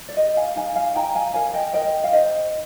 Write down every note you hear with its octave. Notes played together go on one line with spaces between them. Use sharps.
D5
G4 C5 D#5
F5 G#5
D#4 F5 G#5
F5 G#5
D#4 G5 A#5
F5 G#5
A#4 F5 G#5
D#5 G5
A#4 D#5 G5
F5
D#4 C5 D#5